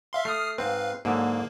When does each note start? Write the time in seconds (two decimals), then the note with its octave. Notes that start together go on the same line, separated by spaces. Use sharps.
0.13 E5 F5 C6
0.25 A3 D#6 F6 C7
0.58 G#2 C4 B4 F5
1.05 G#2 D3 F#3 A#3